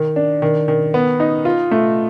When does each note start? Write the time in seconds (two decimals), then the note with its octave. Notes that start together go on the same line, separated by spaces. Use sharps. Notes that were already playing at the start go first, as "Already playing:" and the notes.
Already playing: D#3
0.16 D4
0.42 D#3
0.68 D#3
0.94 B3
1.20 D#4
1.45 F4
1.71 A3